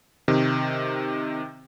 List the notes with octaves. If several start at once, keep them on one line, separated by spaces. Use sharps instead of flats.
C3 D#3